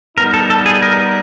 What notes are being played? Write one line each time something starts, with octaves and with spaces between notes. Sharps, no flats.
G3 B3 D#4 A#4
A4
A4
G#4
A#4